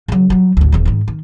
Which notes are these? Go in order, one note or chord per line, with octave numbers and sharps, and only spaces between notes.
C#3 F#3
F#3 G3
G#1 D2
D#1 E2
G#2 D#3
D#3